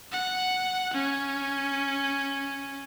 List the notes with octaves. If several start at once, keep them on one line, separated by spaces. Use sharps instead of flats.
F#5
C#4